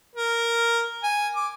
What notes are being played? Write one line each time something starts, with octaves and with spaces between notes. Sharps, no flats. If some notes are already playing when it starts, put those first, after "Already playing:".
A#4
G#5
D6